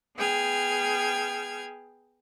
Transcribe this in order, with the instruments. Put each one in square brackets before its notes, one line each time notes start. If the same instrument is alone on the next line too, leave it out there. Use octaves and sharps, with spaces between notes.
[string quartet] B3 G#4 G5 F6 G#6